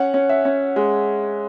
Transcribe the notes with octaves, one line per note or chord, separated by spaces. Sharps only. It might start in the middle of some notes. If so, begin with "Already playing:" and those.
Already playing: C#4 F#5
C#4
E5
C#4
G#3